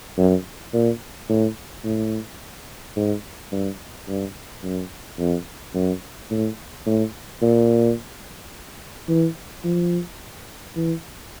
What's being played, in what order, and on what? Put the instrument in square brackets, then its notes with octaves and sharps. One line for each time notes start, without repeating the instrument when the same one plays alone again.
[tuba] F#2
A#2
A2
A2
G#2
G2
G2
F#2
F2
F#2
A2
A2
A#2
E3
F3
E3